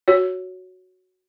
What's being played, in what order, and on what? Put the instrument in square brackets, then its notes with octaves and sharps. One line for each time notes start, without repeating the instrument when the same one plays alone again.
[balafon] F#4 C#5